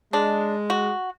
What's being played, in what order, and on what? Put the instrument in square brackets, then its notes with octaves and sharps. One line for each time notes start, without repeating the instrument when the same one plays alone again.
[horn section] G#3 [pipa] D4
[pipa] F#4